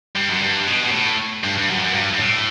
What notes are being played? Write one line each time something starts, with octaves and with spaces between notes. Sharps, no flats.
G2
F#2
G2
B2
B2
A2
G2
G2
F#2
F#2
G2
G2
A2